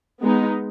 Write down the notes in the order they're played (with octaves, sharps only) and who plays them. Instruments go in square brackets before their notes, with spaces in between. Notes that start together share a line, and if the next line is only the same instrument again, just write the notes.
[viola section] G#3 B3 D#4